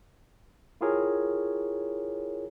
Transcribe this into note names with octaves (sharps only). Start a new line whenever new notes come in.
E4 F4 G4 G#4 A#4 C#5